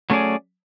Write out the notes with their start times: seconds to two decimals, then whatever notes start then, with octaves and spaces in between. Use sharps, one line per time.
0.10 F#3 A3 C#4 G#4 D5